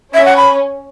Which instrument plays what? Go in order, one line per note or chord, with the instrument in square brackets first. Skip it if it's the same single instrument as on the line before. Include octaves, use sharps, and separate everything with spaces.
[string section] C#4 [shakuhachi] E5
[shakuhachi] F#5
B5